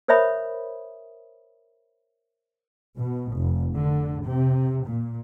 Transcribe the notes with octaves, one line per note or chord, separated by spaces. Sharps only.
A#4 C5 C#5 E5 B5 D#6
B2
F1
D3
C3
A#2